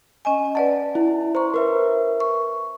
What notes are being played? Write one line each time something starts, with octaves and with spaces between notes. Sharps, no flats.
C#4 D#5 G#5
B4 D5 F#5 A5
E4
C5 A#5 C#6
A#4 B4 E5
C#6